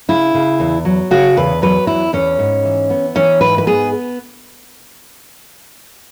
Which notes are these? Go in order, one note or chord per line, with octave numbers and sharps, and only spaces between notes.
C#3 E4
C#3
E2
F#3
C#3 F#4
E2 B4
F#3 B4
E2 E4
E2 C#4
G#2
E3
B3
E3 C#4
G#2 B4
B4
B3 G#4